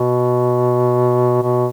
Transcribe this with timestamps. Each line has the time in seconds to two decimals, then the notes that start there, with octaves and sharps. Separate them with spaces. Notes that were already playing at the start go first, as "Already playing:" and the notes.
Already playing: B2
1.42 B2